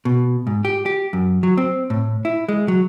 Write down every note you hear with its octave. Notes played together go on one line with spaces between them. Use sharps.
B2
G#2
G4
G4
F#2
F#3
C4
A2
E4
G#3
F#3